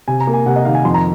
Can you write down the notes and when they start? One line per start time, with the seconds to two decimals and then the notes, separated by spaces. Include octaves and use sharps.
0.08 C3 G#5
0.20 A#5
0.27 A#3
0.34 G#5
0.46 C3 F#5
0.56 D#5
0.65 D#3 F5
0.75 G#5
0.85 F2 C6
0.94 A#5